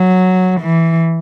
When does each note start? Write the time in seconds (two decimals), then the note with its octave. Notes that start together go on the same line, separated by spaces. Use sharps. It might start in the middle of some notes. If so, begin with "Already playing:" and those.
Already playing: F#3
0.61 E3